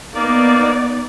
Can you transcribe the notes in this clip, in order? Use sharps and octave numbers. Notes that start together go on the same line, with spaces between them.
A#3 B3 D#4 D5